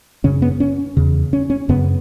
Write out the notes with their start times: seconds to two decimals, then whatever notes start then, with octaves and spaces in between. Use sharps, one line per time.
0.24 F#2 C#3 C#4
0.42 B3
0.60 C#4
0.97 E2 C#3
1.33 C#4
1.50 C#4
1.69 F#2 C#3 B3